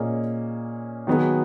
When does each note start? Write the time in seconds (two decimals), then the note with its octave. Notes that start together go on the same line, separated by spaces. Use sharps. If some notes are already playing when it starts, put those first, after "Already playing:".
Already playing: A#2 A#3 C#4 G#4 D#5
1.07 D#3 F#3 B3 D#4 G#4